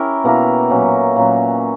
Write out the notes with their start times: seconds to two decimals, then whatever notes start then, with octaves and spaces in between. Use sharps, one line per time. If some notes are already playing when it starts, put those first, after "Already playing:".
Already playing: C#4 E4 G4 A#4
0.24 B2 A#3 E4 A#4
0.70 A#2 F#3 C#4
1.16 A#2 F#3 C#4